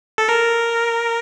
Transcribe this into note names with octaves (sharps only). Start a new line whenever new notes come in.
A4
A#4